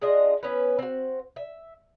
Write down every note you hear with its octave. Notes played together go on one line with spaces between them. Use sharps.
G#3 D4 F4 D#5
B3 C#4 E4 B4
C4 F#4
E5